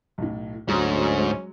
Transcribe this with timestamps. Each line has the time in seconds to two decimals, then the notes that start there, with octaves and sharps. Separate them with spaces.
0.18 B1 A2
0.68 D2 G#2 F#3 G#3 C#4